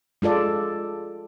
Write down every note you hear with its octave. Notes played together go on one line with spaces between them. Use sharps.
G#3 F4 A4 D5